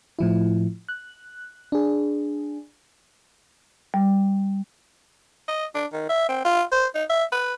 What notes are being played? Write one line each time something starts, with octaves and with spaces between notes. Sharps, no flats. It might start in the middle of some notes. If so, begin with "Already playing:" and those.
A2 F3 E4
F#6
D4 G#4
G3
D#5
D4
D#3
E5
C4
F4
C5
D#4
E5
B4